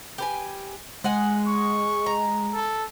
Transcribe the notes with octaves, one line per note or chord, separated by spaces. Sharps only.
G4 B4 G#5
G#3 D#5 F#5 G#5
C#6
A#5
A4